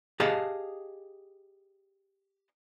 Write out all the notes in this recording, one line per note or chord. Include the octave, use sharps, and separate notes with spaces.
G4 G#4 D#5 F5 A5